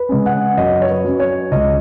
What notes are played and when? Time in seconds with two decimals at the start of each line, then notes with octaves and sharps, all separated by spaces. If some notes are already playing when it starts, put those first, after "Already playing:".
Already playing: B4
0.09 C#3 G#3 C#4
0.26 F#5
0.57 F#2 D#5
0.82 C#5
0.89 B4
1.04 F#3 C#4
1.20 C#5
1.51 C#2 D#5